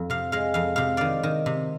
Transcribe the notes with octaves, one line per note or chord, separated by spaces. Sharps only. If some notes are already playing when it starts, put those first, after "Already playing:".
Already playing: F2
C3 F5
G#3 F5
F2 F5
C3 F5
D#3 D5 F5
D#3
C3